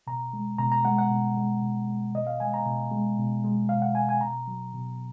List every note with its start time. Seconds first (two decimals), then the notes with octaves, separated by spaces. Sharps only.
0.07 B2 A#5
0.33 G#3
0.58 B2 A#5
0.72 A#5
0.85 G#3 F#5
0.98 F#5
1.10 B2
1.37 G#3
1.62 B2
1.88 G#3
2.15 B2 D#5
2.27 F5
2.40 G#3 G#5
2.54 A#5
2.66 B2
2.92 G#3
3.18 B2
3.44 G#3
3.69 B2 F5
3.82 F#5
3.95 G#3 G#5
4.09 G#5
4.21 B2 A#5
4.47 F#3
4.74 B2